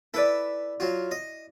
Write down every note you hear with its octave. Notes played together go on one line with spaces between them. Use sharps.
E4 A4 B4 D5
F#3 F4
D#5